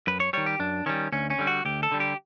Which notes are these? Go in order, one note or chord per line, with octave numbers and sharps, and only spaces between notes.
F#2 B4
C#5
D#3 G3 C#5
G4
F#2 D4
D#3 G3 C#4
D2 C#4
C#4
D3 G3
F#4
D2 G4
A4
D3 G3
G4